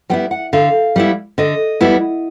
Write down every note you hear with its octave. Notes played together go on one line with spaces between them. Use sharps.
G3 B3 E4 G5
F#5
D3 F5
G3 B3 E4
D3 D#5
G3 B3 E4